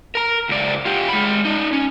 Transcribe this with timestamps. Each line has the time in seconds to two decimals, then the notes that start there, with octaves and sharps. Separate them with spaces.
0.15 A#4 A#5
0.49 C#2 D5
0.86 F4 G4
1.09 G#3 B5
1.45 D#4 D5
1.73 C#4